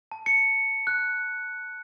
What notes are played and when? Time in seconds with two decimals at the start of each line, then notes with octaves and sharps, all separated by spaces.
0.12 A5
0.26 C#7
0.87 F#6